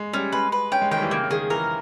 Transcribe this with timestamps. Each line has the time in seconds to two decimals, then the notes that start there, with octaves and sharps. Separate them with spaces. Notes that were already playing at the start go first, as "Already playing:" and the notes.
Already playing: G#3
0.14 G3 C#4
0.32 G#3 B4
0.52 B4
0.72 C#4 G5
0.82 G#3
0.91 D#3 G5
0.97 G3
1.02 E3
1.11 C#3 A#3
1.24 C#3
1.31 D#3 G#4
1.50 E3 A#4